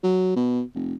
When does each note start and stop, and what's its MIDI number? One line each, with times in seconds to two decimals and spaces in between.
0.03 0.31 54
0.36 0.62 47
0.75 0.94 29